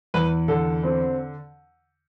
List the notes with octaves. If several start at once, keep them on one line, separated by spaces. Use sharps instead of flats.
E2 B4
D3 A4
C4